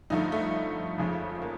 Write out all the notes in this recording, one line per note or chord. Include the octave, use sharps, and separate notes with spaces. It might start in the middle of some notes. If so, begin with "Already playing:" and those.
G2 D3 F3 A3 D#4
A3
F2 C#3 F3 G#3
A#3